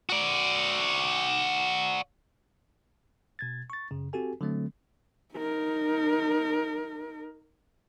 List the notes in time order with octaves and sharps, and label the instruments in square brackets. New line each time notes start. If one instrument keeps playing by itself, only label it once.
[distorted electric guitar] F#4 D5
[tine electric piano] B2 G#6 A6
C#6 A6
F#2 C#3
C4 F#4 G4 A4 G#5
D3 F#3 A3 C4
[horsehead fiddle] D#4 A#4